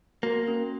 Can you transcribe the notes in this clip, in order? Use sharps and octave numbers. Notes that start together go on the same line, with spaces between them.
A#3 F#4
C#4